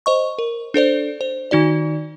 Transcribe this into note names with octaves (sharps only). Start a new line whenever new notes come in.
C5 D#5 C#6
A#4
D4 A4 C5 D5
C5
D#3 D#4 F#4 D5